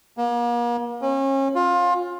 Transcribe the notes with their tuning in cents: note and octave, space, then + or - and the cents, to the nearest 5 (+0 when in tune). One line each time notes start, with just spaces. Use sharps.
A#3 +40
C#4 -35
F4 +20